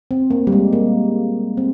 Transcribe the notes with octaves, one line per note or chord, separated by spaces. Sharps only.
C4
A#3
G3
G#3
A#3
C4